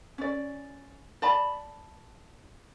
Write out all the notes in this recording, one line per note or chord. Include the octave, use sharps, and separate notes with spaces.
C#4 D5
D5 A5 B5